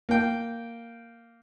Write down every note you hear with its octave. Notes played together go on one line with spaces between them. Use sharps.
A#3 G5